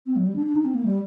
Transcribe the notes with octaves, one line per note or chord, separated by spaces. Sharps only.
C4
F#3
G3
D4
D4
D#4
C4
A#3
G3